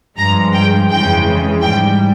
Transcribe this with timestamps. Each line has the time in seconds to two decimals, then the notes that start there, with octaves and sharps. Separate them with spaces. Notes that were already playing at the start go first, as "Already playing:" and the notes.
0.17 G2 F3 G#3 A#5
0.53 G5
0.89 F2 C#3 E3 G#3 G5
1.62 G#2 G3 G5